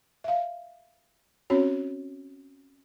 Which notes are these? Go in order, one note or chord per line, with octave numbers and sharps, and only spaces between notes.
E5 F5
C4 C#4 F#4 C#5